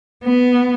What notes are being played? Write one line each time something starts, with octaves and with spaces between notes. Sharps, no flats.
B3